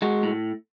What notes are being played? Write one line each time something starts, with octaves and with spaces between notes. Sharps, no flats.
G#3 F#4
A2